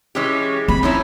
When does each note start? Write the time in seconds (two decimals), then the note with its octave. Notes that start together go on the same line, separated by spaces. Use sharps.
0.15 E3 G#3 C#4 G4
0.68 C4 B5
0.83 F3 C#4 D#4 E4